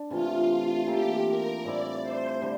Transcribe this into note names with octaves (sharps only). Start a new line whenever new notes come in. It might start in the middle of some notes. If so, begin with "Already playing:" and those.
Already playing: D4
C3 E3 A3 F4
F4
E3 A#3 F4 G4 A4
A#4
A2 G3 C4 E4 D5
C5
D3 G3